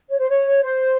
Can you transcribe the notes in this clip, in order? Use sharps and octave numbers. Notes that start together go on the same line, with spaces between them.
C#5
C5
C#5
C5